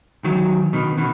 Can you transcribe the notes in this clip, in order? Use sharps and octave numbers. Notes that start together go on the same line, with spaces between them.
D#3 F#3
B2 D#3
B2 D#3